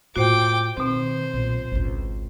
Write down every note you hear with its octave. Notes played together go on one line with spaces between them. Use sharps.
A2 F4 F#4 C5 G5 D6
B2 D#3 C4 C5
B1 A#2
G#1 C#2